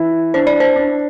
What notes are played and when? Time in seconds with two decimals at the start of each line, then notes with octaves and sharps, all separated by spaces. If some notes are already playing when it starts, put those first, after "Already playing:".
Already playing: E3 E4
0.34 D4 C5
0.47 D5
0.60 C5
0.76 D4